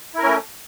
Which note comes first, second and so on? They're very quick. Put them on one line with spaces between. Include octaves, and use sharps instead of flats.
E4 A#4 C#4 A3